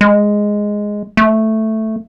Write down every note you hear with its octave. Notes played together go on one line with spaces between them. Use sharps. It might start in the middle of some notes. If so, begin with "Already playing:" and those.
G#3
A3